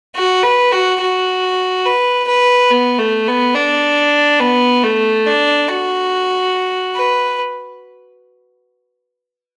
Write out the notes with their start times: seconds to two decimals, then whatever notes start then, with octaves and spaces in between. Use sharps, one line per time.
0.15 F#4
0.43 B4
0.72 F#4
1.01 F#4
1.85 B4
2.28 B4
2.70 B3
2.98 A3
3.27 B3
3.55 D4
4.40 B3
4.83 A3
5.26 D4
5.68 F#4
6.95 B4